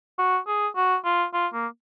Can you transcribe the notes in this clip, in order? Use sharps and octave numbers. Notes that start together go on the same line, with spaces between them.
F#4
G#4
F#4
F4
F4
A#3